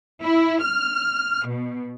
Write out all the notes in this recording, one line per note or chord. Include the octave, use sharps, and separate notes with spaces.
E4
F6
B2